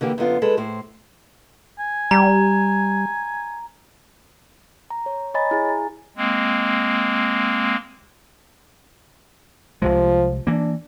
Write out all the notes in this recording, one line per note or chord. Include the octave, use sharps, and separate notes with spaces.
D3 E3 A#3 G4
F#2 D3 B3 F4
G#3 A4 B4
A2 C5
G#5
G3 A#5
A#5
C#5
C#5 D#5 G#5 A#5 B5 A6
E4 G#4 G#5
A#5
G#3 A#3 C4
C2 C3 F3 G#3
E3 A#3 D4